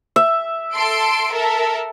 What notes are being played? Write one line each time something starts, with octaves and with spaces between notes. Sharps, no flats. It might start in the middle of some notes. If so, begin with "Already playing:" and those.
E5
A4 C6 D7
A4 A#4 E5